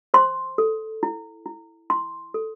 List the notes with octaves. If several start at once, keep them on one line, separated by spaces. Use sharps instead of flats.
C5 C6
A4
E4
E4
E4 C6
A4